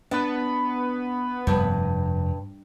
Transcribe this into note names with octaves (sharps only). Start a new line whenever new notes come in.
B3 D4 B4
F1 G2